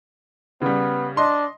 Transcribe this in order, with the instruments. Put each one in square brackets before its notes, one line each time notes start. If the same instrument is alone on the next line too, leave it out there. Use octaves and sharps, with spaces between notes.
[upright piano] C#3 G3 [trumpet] B3
[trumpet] D4 [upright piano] D#5 C6